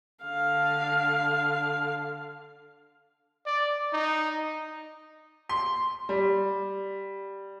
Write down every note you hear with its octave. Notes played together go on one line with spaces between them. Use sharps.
D3 F5
D5
D#4
C6
G3